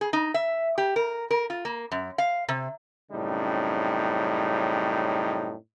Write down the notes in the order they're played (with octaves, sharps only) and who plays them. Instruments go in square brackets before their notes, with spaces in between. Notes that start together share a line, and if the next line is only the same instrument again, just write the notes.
[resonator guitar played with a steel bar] G#4
D#4
E5
G4
A#4
A#4
F4
A#3
F#2
F5
C3
[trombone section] F#2 A2 C#3 G3 C4 D#4